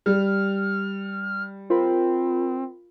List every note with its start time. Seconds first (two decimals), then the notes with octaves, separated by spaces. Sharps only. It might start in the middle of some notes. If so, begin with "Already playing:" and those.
0.06 G3 F6
1.70 C4 F4 A#4 B5